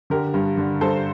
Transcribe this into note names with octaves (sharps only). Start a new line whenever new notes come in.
D3 G4 A#4
G2
D3
G2 A4 C5